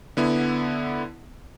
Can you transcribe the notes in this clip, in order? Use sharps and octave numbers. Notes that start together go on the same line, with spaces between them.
D3 B3 E4